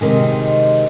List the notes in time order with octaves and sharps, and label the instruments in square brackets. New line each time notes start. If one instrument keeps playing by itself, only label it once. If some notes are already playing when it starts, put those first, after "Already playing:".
[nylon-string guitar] C3 D#3 G#3